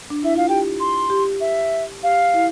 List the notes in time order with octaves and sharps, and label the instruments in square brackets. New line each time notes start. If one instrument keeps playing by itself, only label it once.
[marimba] D4
[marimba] E4 [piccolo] E5
[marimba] F4 [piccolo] F5
[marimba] G4 [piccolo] G5
[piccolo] C6
[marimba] G4
[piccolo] E5
[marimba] G4 [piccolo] F5
[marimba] E4